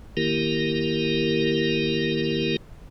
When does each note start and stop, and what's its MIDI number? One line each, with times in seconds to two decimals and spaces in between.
0.17 2.56 51
0.17 2.56 58
0.17 2.56 64
0.17 2.56 67
0.17 2.56 70